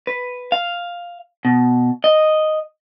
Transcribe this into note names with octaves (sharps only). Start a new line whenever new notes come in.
B4
F5
B2
D#5